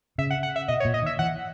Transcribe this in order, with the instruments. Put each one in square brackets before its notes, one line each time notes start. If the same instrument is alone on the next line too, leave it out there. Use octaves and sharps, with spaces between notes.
[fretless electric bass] C#3 [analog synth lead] E5
[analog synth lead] F#5
F#5
E5
[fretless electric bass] B2 [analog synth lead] D#5
[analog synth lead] C#5
[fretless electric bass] A#2
[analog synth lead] D#5
[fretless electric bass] D#3
[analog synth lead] E5
[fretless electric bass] E3 [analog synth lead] F#5